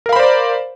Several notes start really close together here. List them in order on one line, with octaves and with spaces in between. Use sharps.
A#4 F5 B5 C5 D5